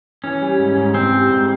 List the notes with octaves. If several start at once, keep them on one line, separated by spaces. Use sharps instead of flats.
E3 C#4
G3
G#2
G#2
E3 C4
G3
G#2